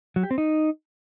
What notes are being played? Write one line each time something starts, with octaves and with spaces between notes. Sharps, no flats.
F#3
G4
C4
D#4